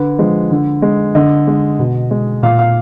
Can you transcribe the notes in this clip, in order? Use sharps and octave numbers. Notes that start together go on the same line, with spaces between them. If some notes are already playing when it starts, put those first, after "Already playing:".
Already playing: D3 B4
F3 G#3
D3
G#3
D3 D#5
G#3
B2
G#3
A#2 F5
F5